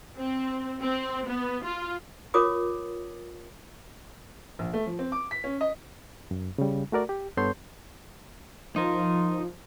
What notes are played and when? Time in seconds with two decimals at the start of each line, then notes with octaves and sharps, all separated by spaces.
0.18 C4
0.81 C4
1.28 B3
1.64 F4
2.34 F4 A#4 C#5 D6 D#6
4.59 A#1
4.73 A3
4.86 F3
4.99 C4
5.12 D6
5.31 B6
5.44 C#4
5.61 D#5
6.31 F#2
6.58 C#3 G3
6.92 A3 F#4 A#4 D5
7.09 G4
7.37 G2 B3 A4 C#5 C6 G6
8.76 F3 D#4 F4 A#4